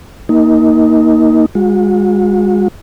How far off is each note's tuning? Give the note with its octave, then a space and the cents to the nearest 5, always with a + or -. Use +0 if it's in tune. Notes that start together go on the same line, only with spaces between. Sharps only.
A#3 +0 D#4 +20
G#3 -30 F#4 -40